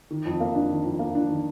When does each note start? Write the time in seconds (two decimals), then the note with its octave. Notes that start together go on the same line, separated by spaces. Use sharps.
0.11 D#3
0.25 F2
0.40 A#3
0.55 D4
0.70 D#3
0.85 F2
0.99 A#3
1.15 D4
1.29 D#3